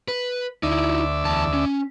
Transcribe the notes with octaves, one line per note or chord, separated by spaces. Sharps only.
B4
D2 D#4 E4 D5 E5
E2 A5
C#4